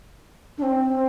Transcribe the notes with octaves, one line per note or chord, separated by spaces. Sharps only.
D4
C4